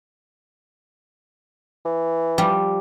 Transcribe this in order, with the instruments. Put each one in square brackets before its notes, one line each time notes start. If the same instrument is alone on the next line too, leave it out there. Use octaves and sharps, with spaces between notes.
[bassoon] E3
[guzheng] F3 G3